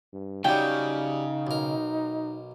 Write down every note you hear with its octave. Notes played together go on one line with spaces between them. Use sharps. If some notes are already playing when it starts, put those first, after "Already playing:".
G2
C#3 F#3 G3 D#4 G5
B1 A#4